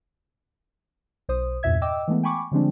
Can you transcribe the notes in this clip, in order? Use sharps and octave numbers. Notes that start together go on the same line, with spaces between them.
B1 C5 D#6
E2 G2 A#2 E5 G#6
D#5 G5 D6 E6
E3 G#3 A3 B3
G5 G#5 B5 C#6 D6
D3 F3 G3 G#3 C4 D4